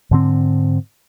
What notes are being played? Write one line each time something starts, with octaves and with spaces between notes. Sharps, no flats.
G#2 D3 C4